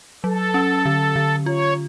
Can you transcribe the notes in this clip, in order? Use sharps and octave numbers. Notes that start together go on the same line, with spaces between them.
F#3 A4
C#4
D3
D3
F4 C#5